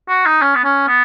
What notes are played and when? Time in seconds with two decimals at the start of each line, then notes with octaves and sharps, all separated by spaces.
0.08 F#4
0.26 D#4
0.42 C#4
0.55 B3
0.64 C#4
0.88 B3